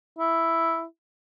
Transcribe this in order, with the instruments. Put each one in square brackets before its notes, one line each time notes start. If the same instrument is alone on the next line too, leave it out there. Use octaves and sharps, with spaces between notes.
[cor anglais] E4